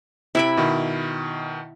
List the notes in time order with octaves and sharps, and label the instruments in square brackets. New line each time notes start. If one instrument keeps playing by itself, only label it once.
[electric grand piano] C3 D7 [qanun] E4 E5 B5
[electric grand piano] B2 D#3